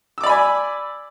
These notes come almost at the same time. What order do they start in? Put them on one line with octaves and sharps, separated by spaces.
E6 D6 D5 B5 G#5